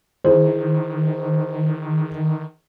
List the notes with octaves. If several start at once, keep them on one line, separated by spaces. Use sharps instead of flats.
D#3 E4 G#4 C5